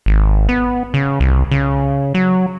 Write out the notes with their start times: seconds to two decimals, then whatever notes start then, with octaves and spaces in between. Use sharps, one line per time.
0.06 G#1
0.49 B3
0.94 C#3
1.20 C2
1.51 C#3
2.14 F#3